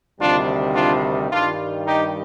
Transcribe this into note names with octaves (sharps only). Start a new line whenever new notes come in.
D2 C3 D#3 G3 D4 F4
D4 F4
G2 D#3 G3 D4 F4
D#4 G4